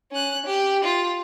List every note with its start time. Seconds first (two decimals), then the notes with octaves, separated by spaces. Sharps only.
0.11 C#4 F#6
0.46 G4
0.84 F4